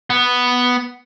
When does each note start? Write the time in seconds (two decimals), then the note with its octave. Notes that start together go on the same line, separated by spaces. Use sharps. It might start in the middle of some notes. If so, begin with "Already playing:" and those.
0.10 B3